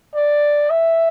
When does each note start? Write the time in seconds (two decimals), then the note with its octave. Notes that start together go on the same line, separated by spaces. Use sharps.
0.14 D5
0.70 E5